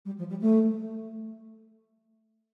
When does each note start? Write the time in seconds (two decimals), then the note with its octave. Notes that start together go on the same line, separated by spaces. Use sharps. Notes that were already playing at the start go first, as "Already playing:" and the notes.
0.05 G3
0.18 F3
0.29 G3
0.41 A3